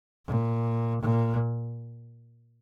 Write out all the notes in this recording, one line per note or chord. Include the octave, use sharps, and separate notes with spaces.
A#2
A#2